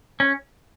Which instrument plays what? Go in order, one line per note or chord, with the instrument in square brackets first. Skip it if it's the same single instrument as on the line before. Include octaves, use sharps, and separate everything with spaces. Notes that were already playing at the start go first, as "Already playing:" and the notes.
[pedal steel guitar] C#4